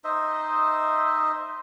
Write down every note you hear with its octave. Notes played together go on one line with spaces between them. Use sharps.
D#4 C5 D#5 E5